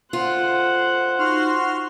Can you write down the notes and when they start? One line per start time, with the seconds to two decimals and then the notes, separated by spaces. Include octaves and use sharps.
0.13 D3 F4 C5 F#5
1.19 D#4 F#4 C6 F6